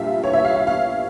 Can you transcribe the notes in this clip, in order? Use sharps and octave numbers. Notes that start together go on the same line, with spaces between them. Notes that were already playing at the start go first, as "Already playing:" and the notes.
Already playing: A#1 A#2 G3 E5 F5
C#5
E5
F5
F5
F5